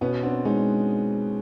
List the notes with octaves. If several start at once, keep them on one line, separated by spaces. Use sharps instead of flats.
B2 B3 C#4
C4 D4 F#4
G#3 C#4 D#4